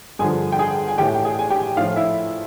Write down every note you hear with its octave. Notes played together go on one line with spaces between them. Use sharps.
G2 D3 F3 G#4 G#5
G5
G#4 G#5
G#5
A2 E3 G4 G5
G5
G#4 G#5
G#5
G4 G5
A2 F3 F4 F5
E4 E5